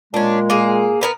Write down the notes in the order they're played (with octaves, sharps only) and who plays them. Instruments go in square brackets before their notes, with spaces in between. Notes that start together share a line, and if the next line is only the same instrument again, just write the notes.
[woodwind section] A#2 G#3 [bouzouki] C#4 D4
[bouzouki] A#3 G#4
B3 A#4 B4